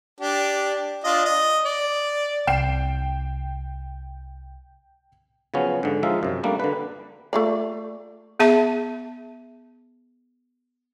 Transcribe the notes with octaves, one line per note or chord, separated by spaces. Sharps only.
D4 G4
D4 F4 D#5
D#5
D5
C2 G5 C7 E7
C#3 F3 F#3 B3 C#4
G#2 D3
F3 G#3 D#4 E5 F5
F#2 C3
G3 A3 A#3 D4
D3 B4
A3 F4 D5
B3 G#4 E5 A5